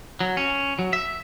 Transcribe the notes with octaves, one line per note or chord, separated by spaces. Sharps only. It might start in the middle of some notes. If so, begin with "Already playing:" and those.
F#3
C#4
F#3
E5